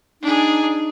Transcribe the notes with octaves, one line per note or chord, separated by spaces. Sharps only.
D4 D#4 G#4